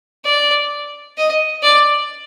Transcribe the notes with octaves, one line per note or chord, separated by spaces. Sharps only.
D5
D#5
D5